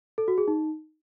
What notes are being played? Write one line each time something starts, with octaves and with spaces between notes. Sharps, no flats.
A4
F#4
G#4
D#4